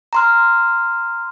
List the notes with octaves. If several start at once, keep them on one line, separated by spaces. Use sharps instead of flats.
A#5 C6 F6